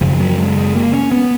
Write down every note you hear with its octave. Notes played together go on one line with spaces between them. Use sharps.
F#2 C#3 F3
F#3
G#3
G#3
A#3
C#4
B3